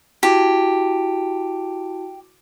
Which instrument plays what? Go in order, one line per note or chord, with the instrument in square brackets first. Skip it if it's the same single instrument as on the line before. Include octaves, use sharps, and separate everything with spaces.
[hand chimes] E4 F#4 A5 [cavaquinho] G4